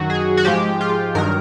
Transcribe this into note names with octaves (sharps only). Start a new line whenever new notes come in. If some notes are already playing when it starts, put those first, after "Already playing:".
Already playing: F#2 D#3 F#3 F#4
G#4
F#4
G#2 F3 G#3 G4
F4
G2 D#3 F#3 A#4